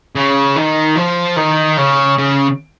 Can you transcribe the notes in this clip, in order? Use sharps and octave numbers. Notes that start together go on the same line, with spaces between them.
C#3
D#3
F3
D#3
C#3
C#3